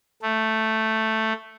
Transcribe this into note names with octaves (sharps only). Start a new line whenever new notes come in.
A3